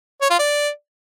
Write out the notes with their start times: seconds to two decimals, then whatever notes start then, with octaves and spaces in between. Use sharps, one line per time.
0.21 C#5
0.30 F4
0.39 D5